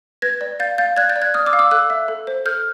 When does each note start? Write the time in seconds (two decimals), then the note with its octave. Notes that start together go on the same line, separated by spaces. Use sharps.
0.22 B4 G#6 A#6
0.41 D5
0.60 F5 G6 A6
0.78 F5 G6 A6
0.97 D5 F#6 G#6
1.09 G6 A6
1.16 D5
1.22 F#6 G#6
1.34 D5 D#6 F6
1.46 D6 E6
1.53 F5
1.59 D6 E6
1.71 A4 E6 F#6
1.90 E5
2.08 A4
2.27 C5
2.46 A4 F6 G6